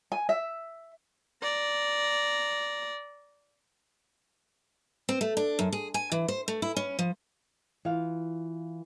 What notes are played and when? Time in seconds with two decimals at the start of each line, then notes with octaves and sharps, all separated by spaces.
0.12 G#5
0.29 E5
1.43 D5 A#5
5.09 C4
5.21 A3
5.37 D4
5.59 F#2
5.73 G#4
5.94 G#5
6.12 E3
6.28 C5
6.48 A3
6.62 E4
6.77 C#4
6.99 F3
7.85 E3 F4 F5